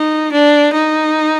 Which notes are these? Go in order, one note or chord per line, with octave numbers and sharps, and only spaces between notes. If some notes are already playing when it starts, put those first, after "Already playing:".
Already playing: D#4
D4
D#4